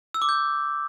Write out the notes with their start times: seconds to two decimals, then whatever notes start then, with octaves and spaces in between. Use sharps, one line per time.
0.14 E6
0.22 D6
0.29 G6